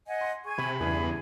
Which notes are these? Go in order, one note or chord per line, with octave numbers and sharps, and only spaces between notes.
D#5 F#5 G#5
C6
G#4 G#5 C#6
C3 B5
E2 G2 C#3 E3 G#4